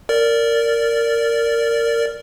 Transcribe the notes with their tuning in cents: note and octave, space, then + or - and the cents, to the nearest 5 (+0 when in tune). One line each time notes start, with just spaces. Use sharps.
A#4 -15 D5 -15